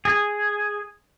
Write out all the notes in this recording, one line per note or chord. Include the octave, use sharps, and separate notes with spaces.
G#4